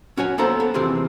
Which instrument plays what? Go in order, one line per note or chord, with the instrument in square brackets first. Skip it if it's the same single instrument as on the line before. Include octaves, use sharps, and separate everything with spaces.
[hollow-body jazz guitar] C#4 F#4 C#5 G#5
A#3 B3 A4 C5 A5 A#5
B3 A4
C3 E3 C4 F4 G4 G#4